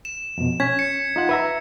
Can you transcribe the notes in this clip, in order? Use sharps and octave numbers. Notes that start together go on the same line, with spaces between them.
E7
F2 B2
C#4 G#6 B6
C#7
D#4 F4 F#5
B4 E5 A#5